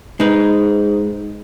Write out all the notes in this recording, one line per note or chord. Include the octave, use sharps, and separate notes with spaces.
G#2 G#3 D#4 B4